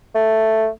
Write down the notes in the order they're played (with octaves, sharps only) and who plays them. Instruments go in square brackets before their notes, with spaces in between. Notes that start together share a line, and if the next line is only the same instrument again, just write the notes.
[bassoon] A3